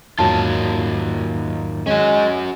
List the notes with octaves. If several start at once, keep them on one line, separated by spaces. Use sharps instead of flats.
E2 G#2 D#3 F#3 A#3 F4 A5
G#3 C#4 F#4 G#5